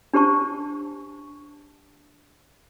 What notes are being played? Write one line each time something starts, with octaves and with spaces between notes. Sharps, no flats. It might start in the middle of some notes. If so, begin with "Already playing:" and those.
D4 G4 C5 A5 C#6